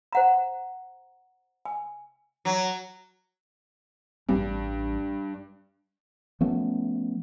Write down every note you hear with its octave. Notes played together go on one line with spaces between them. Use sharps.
C5 F#5 A#5
G#5
F#3
A1 G2 G3 D4
F3 A3 B3 C#4